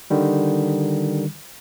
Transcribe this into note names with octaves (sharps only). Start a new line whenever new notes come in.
D3 D#3 G3